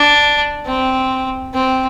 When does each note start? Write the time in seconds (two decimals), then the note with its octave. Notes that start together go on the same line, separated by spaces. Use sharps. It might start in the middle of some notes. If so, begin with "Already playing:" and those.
Already playing: D4
0.66 C4
1.54 C4